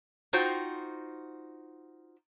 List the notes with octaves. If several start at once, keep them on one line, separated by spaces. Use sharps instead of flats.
D#4 F4 F#4 C5 G5